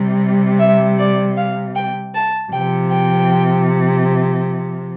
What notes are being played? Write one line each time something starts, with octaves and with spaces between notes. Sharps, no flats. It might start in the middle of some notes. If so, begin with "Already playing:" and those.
Already playing: C3 G3
E5
D5
F5
G5
A5
C3 F3 G5
G5